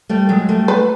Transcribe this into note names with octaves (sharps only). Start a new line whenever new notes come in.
G3 A3
F#3 G#3
G3 A3
B4